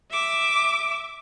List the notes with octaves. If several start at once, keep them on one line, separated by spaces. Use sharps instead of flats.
E5 D6